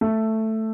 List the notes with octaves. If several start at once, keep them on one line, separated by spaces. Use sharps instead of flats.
A3